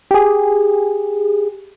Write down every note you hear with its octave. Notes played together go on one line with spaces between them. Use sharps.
G4 G#4